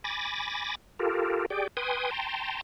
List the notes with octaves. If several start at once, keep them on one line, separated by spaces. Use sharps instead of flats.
G#5 B5 D6 A6 A#6
F4 G4 A4 A#4
G4 G#4 D5 G5
B4 G5 G#5 C6 D#6
G5 A5 A#5 C6